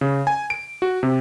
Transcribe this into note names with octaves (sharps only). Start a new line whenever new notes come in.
C#3
G#5
D7
F#4
C3